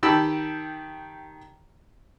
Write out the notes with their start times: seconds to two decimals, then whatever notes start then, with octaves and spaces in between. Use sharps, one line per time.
0.03 D#3 G4 A5 B5 E6